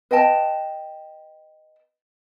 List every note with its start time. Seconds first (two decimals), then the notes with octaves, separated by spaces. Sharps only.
0.11 B4 D#5 G5 A5